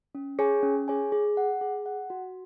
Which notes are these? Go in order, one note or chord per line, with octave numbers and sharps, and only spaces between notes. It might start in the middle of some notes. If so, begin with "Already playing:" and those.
C#4
G#4 C#5 G#5
C#4
G#4 C#5 G#5
G#4
F#5
G#4
F#5
F#4